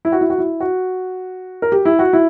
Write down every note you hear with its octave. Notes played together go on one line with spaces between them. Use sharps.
E4
F#4
E4
F#4
E4
F#4
A#4
G4
E4
F#4
E4